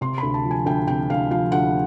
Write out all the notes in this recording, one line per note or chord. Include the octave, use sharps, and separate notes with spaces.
C3 C6
D2 B5
A5
F3
G#5
D2 G5
C3 G5
D2 F5
F3 F5
D2 F#5